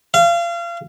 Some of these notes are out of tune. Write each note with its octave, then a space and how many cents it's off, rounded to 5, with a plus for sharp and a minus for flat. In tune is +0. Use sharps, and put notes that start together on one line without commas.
F5 -30